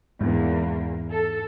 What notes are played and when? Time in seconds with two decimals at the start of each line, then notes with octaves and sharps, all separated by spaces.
0.21 E2 G#2 A#3
1.11 A4